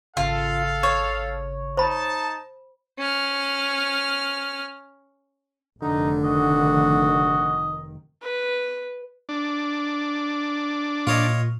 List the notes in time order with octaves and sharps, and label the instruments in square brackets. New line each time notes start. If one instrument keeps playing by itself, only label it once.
[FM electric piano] G#1 C#3 [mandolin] F4 [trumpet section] A4 F5
[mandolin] C#5
[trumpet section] D#4 A5 [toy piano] C5 B5
[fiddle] C#4 F6
[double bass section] F1 D#3 [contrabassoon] D3 [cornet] D#4
[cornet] F#4 [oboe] D#5
[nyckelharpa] B4
[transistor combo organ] D4
[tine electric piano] A#2 [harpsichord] F4 C#5 D#5